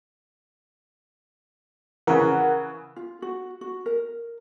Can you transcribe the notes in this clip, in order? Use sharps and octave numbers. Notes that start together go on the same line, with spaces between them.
C#3 E3 A#4 F#5
F4
F#4
F#4
A#4